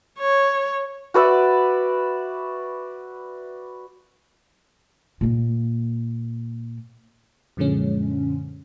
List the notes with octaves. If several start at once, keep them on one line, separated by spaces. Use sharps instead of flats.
C#5
F#4 B4 D5 E5
A#2 A#3
F#2 A#2 D3 F3 G#3 C#4